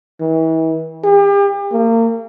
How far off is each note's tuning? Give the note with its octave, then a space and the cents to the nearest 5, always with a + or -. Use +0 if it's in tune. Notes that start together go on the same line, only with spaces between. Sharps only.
E3 -35
G4 +40
A#3 -35